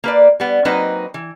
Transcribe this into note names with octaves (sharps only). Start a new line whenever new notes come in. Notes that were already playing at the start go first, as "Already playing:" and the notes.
A#3 B4 D5
G3 B3
F#3 A#3 C4 D#4 B4 D#5
E3